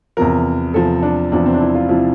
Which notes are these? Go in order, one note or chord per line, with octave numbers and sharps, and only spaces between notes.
E2 C3 F3 A#4
E2 C3 F3 A4
D4
E2 C3 F3 D4
C4
D4
E4
F4
C3 F3 E4